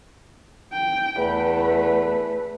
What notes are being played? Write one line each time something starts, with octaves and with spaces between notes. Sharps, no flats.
G5
E2 A3 B4